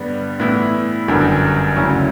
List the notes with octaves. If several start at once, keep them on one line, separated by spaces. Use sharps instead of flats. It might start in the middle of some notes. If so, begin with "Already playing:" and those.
Already playing: G2 D3 G3 B3
A2 E3 B3 E4
G1 F#2 D3 G3
D2 C#3 F#3 C#4 E4